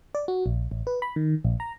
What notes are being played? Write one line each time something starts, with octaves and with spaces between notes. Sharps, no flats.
D5
F#4
A#1
A1
B4
B5
D#3
A#1
A#5